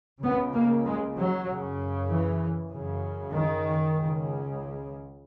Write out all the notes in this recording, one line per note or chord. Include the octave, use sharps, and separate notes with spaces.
C#2 C#3 B3
A#3
G#3
F#3
F#2 C#3
E3
F#2 C#3
D#3
C#2 C#3